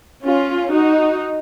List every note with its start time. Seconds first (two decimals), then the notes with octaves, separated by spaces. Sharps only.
0.23 C#4 F4
0.72 D#4 F#4